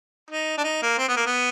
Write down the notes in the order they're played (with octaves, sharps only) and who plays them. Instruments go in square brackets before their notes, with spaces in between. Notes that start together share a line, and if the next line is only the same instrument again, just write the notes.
[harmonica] D#4
D4
D#4
A#3
C4
B3
A#3
B3